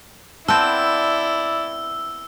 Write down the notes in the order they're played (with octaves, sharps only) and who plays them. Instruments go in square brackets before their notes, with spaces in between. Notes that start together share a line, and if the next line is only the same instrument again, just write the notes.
[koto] B3 C4 [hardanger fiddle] E4 D5 [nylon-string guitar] A5 [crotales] E6